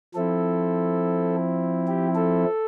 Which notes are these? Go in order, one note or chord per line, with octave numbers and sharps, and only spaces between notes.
F3 C4 E4 A4
G4
A4